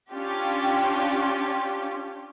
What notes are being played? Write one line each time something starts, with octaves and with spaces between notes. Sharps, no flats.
C#4 D4 F4 G4